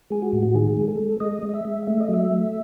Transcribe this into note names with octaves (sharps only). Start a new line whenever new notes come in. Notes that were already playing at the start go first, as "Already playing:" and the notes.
G#3 G#4
F#4
A2
F#4
D#3 G#4
G#3
A4
G#3
G#3 D#5
G#3
D#5
E5
G#3
A3 E5
D#5
F#3 E5
A3